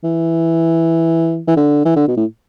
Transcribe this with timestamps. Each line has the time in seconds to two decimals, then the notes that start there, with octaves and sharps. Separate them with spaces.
0.04 E3
1.48 E3
1.57 D3
1.85 E3
1.96 D3
2.08 B2
2.17 A2